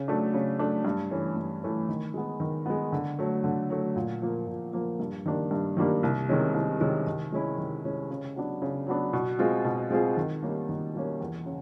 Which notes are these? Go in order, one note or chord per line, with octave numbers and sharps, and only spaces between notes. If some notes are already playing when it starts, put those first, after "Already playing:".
Already playing: C#3
F#3 A3 D4
C#3
F#3 A3 D4
G2
E3 A3 C#4
G2
E3 A3 C#4
D#3
G#3 B3
D#3
G#3 B3
D3
F#3 A3
D3
F#3 A3
A#2
F3 A#3
A#2
F3 A#3
G2
D#3 G3 A#3 D4
G2
D#3 G3 A#3 D4
C2
C3 D#3 G#3 C#4
C2
C3 D#3 G#3 C#4
D#3
G#3 C#4 E4
D#3
G#3 C#4 E4
C#3
F#3 B3 D4
C#3
F#3 B3 D4
B2
G#3 C4 F4 G#4
B2
G#3 C4 F4 G#4
D#3
G3 A#3 C#4
D#3
G3 A#3 C#4
E2
C#3